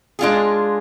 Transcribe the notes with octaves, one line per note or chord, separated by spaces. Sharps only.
G#3 D4 F4 G#4